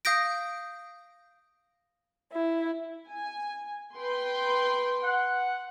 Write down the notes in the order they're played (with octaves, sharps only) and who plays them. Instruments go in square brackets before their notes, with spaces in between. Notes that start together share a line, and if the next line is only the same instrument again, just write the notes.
[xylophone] F5 D#6 G6 A#6 D7
[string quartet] E4
[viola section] G#5
B4 G5 C6
[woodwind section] F#5